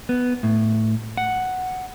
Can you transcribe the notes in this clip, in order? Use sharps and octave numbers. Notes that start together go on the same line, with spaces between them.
B3
A2
F#5